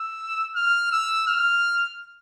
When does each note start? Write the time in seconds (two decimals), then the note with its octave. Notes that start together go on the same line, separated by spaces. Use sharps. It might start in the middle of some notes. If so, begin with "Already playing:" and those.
Already playing: E6
0.56 F6
0.92 E6
1.28 F6